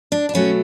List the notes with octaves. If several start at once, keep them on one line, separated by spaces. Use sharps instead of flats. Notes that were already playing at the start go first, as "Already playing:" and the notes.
D4
D4
B2 F#3 A3 C#4